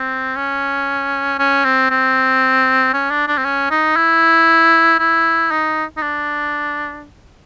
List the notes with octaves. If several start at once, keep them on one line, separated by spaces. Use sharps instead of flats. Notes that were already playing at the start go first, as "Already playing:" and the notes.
Already playing: C4
C#4
C#4
C4
C4
C#4
D4
D4
C4
C#4
D#4
E4
E4
D#4
D#4
D4